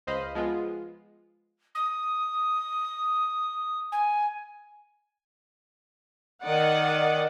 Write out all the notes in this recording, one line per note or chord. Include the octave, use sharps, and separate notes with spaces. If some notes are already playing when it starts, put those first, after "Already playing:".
C#2 C5 D#5 F5 B5
F3 G#3 B3 F4
D#6
G#5
D#3 D5 D#5 F#5